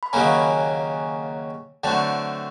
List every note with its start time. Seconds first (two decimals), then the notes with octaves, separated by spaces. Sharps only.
0.03 B5
0.13 D#2 C#3 F#3 A#3 C#4 G#5 A#5
1.83 D3 F#3 A3 C4 G5 A5